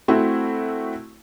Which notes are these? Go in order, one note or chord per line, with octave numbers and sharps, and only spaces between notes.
A3 C4 E4 F#4